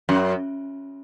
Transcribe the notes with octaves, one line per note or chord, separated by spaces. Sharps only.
F#2